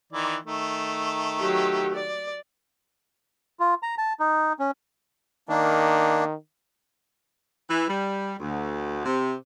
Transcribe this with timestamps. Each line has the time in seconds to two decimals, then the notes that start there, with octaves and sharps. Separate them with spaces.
0.13 D#3 E3 D5
0.46 D#3 A3
1.40 F#3 G4
1.95 D5
3.60 F4
3.83 A#5
3.98 A5
4.20 D#4
4.59 C#4
5.49 D#3 A#3 D4
7.69 E3
7.87 G3
8.39 D2
9.05 C3